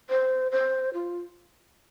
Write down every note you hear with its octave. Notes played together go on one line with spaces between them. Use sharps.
C5
C5
F4